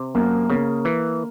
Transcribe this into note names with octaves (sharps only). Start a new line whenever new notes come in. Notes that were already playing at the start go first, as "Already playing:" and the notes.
Already playing: C3
F#2 A#3
C#3 A#3
E3